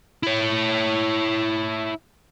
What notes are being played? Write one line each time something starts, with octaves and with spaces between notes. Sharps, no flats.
E4 C#5